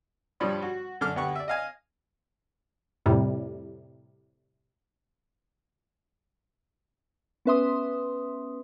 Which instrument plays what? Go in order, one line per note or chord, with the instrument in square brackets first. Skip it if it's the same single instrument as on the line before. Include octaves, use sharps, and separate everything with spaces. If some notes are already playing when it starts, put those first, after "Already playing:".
[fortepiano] G2 F3 G3 C#5 B5 D#6
F#4
F#2 D3 D4 D6 F6
D2 B3 G4 F#5 C#6
D5 E5
D#5 F5 G#5
[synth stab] F2 A2 C3 G3
[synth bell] B3 C#4 B4 E5 C6 D#6